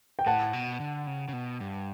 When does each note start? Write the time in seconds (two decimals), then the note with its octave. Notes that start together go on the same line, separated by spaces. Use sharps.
0.19 G5
0.26 A2 F#5 A5
0.53 B2
0.80 D3
1.07 C#3
1.28 C#3
1.33 B2
1.60 G2